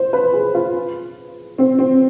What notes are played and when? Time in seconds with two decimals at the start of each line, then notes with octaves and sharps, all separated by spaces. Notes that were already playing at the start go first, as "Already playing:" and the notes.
Already playing: C5
0.13 B4
0.33 G#4
0.55 F4
1.58 C4
1.79 C4